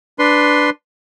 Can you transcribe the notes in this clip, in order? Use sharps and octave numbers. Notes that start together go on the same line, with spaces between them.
D4 B4 C6